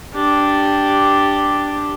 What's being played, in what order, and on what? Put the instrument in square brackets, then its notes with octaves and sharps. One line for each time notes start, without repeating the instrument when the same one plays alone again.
[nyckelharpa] D4 G4